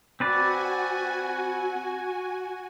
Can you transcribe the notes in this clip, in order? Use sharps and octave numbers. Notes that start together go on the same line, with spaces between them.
C4 F#4 B4 D5 G#5